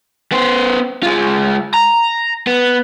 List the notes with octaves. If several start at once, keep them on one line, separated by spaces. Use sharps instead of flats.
B3 C5
G#3 F4
A#5
B3